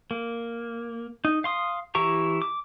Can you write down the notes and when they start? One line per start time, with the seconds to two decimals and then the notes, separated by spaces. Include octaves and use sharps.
0.11 A#3
1.25 D#4
1.44 F5 C6 D#6
1.95 E3 E4 G4 A#5 C#6
2.42 D6